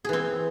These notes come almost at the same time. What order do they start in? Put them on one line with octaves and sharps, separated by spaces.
G#4 E3 C4